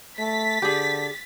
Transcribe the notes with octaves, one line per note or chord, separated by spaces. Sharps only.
A3 A6 B6
D3 G4 G#4